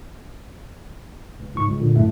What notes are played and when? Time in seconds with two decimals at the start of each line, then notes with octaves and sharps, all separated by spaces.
1.40 C#2
1.54 C#2 G#2 C#6
1.67 C#2
1.80 A#2 D3
1.95 C2 F#2 A2 A3